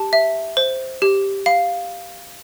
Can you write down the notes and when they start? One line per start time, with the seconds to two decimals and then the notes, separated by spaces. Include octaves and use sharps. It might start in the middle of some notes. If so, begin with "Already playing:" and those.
Already playing: G4 A5
0.13 E5
0.57 C5
1.02 G4
1.46 F5